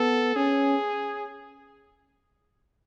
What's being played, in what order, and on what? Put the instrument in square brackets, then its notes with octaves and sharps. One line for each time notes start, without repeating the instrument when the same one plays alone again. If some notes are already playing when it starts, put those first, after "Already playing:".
Already playing: [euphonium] B3 [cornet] A4
[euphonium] C#4 [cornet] G#4